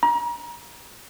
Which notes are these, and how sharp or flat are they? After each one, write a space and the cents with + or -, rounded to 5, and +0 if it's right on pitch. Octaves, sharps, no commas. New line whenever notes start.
A#5 +35